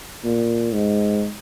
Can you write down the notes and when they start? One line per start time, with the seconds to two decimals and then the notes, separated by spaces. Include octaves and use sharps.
0.24 A#2
0.74 G#2